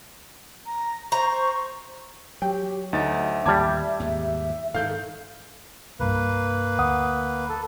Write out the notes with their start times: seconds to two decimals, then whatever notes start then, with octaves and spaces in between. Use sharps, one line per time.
0.65 A#5
1.12 C5 A#5 C#6
2.42 F#3 G4 G5
2.93 D2 D#4 E5 A6
3.46 D#2 A2 G3 A5 D6 G#6
4.00 D#2 G#2
4.74 G#2 D#3 A4 F5 G6
6.00 C2 G2 A#3 B4
6.79 D2 F#5 D#6
7.49 A4